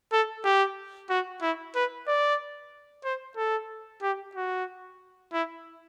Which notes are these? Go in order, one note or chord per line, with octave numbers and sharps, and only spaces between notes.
A4
G4
F#4
E4
B4
D5
C5
A4
G4
F#4
E4